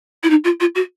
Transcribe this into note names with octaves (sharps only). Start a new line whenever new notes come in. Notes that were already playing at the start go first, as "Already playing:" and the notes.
E4
D#4
F4
F4
F#4